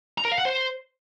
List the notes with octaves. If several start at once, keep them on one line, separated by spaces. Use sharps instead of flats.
A#5
A#4
F5
F#5
C5